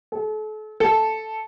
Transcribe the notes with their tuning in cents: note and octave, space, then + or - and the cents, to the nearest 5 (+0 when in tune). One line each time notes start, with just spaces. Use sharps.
A4 -40
A4 -5